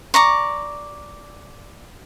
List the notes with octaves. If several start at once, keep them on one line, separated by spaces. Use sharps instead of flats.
D5 A#5 C#6